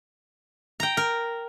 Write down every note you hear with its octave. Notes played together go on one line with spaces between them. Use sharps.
G5 A#5
A#4